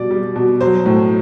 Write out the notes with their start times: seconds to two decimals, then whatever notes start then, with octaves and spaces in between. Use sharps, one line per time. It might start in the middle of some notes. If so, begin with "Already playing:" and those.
Already playing: B2 G3 D5
0.10 G3
0.36 B2
0.61 F#3 C5
0.86 A2